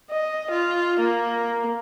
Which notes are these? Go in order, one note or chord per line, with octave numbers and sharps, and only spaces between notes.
D#5
F4
A#3